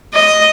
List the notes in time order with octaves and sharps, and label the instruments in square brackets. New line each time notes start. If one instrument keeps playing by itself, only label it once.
[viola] D#5